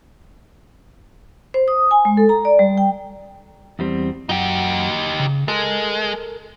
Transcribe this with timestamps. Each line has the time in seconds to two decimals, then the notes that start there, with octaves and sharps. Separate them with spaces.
1.54 C5
1.68 D#6
1.91 G#5
2.05 G#3
2.17 A4
2.29 A#5
2.45 D5
2.59 G3
2.78 G5
3.79 E2 G3 C4
4.29 F#2 D#4 F#4 G4
5.19 C#3
5.48 G#3 A4 A#4